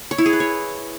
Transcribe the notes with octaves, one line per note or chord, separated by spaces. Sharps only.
C#5
E4
G#4
B4
C#5